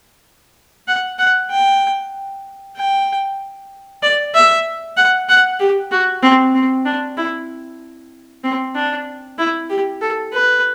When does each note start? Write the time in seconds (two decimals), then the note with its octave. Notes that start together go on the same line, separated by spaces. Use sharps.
0.88 F#5
1.19 F#5
1.51 G5
2.77 G5
4.03 D5
4.34 E5
4.97 F#5
5.29 F#5
5.60 G4
5.91 F#4
6.23 C4
6.54 C4
6.85 D4
7.17 E4
8.44 C4
8.75 D4
9.38 E4
9.70 G4
10.02 A4
10.33 B4